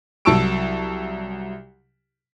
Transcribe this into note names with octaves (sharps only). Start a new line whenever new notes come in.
C2 F#3 A5 C#6 E6 D7